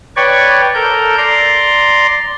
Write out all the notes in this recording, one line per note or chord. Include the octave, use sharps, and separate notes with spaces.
B4 C#5 D5 G5 C#6
A4 A#4 G6
D5 A#5 C6